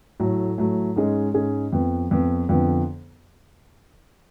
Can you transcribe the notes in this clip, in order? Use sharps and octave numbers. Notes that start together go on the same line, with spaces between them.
A2 F#3 A3
A2 F#3 A3
G#2 G#3 C#4 G#4
G#2 G#3 C#4 G#4
F2 F3 B3
F2 F3 B3
F2 D3 F3 B3